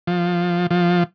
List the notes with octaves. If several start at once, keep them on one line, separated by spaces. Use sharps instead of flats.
F3
F3